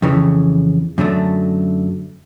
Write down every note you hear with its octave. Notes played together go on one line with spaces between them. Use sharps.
F2 C#3 E3
F#2 D3 F#3 A3